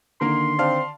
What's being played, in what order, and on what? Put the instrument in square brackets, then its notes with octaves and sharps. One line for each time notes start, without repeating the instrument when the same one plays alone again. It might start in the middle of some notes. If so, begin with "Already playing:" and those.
[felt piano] D3 D#3 [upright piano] A#3 A#4 [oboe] C6
[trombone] C4 [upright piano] D5 F5 A5